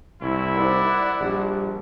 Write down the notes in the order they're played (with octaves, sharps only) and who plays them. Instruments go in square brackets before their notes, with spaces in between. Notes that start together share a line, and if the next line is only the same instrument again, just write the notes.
[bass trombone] C2 [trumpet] E4 [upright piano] C#6
[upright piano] D#4 A#4 C5 [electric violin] D5 F#5
[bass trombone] A#1 [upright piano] F3 G3